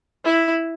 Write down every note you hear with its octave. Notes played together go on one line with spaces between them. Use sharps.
E4